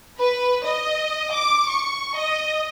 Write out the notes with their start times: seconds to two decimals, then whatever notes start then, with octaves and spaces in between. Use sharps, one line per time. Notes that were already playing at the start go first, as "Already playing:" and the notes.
0.19 B4
0.65 D#5
1.33 D6
1.68 C#6
2.16 D#5